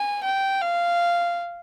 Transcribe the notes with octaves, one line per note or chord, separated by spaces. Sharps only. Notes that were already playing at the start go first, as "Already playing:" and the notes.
Already playing: G#5
G5
F5